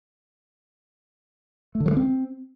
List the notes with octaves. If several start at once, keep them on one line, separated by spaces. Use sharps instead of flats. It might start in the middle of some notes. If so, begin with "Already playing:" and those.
A3
D3
F#3
A3
C4